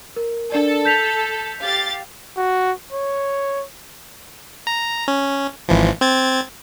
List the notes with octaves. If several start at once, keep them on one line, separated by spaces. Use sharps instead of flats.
A#4
D4 A4 A#4 D5
G6 B6 F7
G4 F5 A6
F#4
C#5
A#5
C#4
G#1 E3 F3
C4 G#6 A6